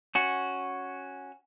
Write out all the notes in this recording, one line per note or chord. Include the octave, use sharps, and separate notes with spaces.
C#4 F#4